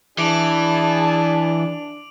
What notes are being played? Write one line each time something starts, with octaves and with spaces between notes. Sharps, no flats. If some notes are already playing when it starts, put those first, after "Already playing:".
E3 D4 G#4 A5 D6 D7 F#7